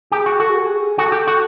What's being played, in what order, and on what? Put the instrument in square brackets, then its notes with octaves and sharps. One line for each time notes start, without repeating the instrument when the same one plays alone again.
[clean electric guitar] G4 [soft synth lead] G#4
[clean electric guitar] F#4
[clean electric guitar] F#4 [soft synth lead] A4
[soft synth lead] G#4
G4
G#4
[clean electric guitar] F#4 [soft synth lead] A4
[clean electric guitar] G4
F#4